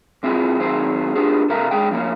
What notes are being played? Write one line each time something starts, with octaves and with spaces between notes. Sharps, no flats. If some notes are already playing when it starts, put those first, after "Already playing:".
A#2 C4 E4 F4 G#4
B1 D#3 F#3 C4 G#4 C5
B3 D4 F4 G4 G#4
C3 A4 A#4 E5 F5 A#5
G#3 C#4 G#4 G5
F3 A#3 C#4